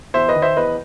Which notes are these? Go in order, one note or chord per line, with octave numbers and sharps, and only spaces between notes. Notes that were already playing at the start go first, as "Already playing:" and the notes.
E2 C5 E5
B4 D#5
D#3
C5 E5
E2 B4 D#5